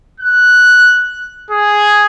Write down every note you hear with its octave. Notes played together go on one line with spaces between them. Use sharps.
F#6
G#4